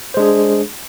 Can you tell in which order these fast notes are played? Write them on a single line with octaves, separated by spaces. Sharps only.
C5 G#3 D4 G#4